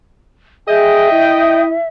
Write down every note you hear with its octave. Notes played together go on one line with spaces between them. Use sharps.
G#4 D#5 E5 G5
E4